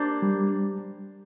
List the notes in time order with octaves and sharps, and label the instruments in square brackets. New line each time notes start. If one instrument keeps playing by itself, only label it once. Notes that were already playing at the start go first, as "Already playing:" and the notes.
Already playing: [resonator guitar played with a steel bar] A#3 D4 G4 C5
[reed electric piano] G3